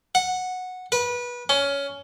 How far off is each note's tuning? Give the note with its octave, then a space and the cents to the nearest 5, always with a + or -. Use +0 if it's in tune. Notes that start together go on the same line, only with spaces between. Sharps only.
F#5 -10
B4 -25
C#4 +15